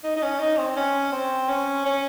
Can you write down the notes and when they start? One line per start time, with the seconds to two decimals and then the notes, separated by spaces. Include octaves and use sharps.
0.03 D#4
0.16 D#4
0.22 C#4
0.39 D#4
0.57 C4
0.76 C#4
1.13 C4
1.49 C#4
1.86 C#4